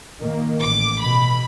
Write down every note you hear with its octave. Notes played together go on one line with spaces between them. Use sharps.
A#2 D#3 A#3
A1 D6
B2 B5